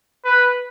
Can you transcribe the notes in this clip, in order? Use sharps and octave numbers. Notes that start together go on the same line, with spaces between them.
B4